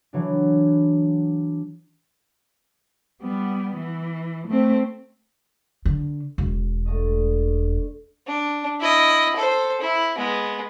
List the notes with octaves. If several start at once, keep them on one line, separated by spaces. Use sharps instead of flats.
E3 F#3 D4
G3 B3
E3
A3 C4
D3
E1
D3 A3 D#5
D4
E4 D#5
A4 C5
E4
G#3 B3